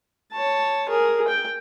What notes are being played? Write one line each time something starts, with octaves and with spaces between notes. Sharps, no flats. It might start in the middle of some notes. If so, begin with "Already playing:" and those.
C#5 A5
G#4 A#4
G5